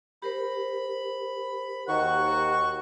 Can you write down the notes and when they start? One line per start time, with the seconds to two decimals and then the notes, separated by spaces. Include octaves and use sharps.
0.22 G4 A#4 C5 B5
1.89 D#2 D#3 F#4 F#5 C#6